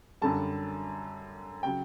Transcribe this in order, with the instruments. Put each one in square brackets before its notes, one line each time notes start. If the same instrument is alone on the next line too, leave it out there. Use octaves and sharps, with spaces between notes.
[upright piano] F#2 D3 G3 A5
C#3 F#3 G5